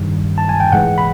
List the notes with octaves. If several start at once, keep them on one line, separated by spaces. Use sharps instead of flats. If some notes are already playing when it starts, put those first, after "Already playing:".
Already playing: G2 D#3 G3
A5
G#5
G5
G#2 E3 G#3 F#5
B5